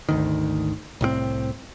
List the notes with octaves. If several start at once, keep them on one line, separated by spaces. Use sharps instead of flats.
G#1 D2 D#3
C2 A2 F3 C4